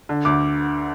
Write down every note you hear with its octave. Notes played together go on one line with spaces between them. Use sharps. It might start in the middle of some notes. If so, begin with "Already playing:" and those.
D3
D2 D6